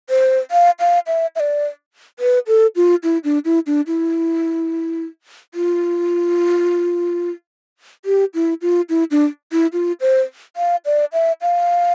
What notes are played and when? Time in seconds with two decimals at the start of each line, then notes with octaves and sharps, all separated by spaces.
0.10 C5
0.51 F5
0.80 F5
1.07 E5
1.36 E5
1.40 D5
2.19 B4
2.47 A4
2.76 F4
3.03 E4
3.24 D4
3.45 E4
3.67 D4
3.87 E4
5.54 F4
8.05 G4
8.34 E4
8.62 F4
8.89 E4
9.11 D4
9.52 E4
9.73 F4
10.01 C5
10.57 F5
10.86 D5
11.13 E5
11.42 F5